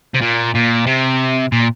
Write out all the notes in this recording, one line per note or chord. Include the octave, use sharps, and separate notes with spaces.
C3
A#2
A#2
C3
A#2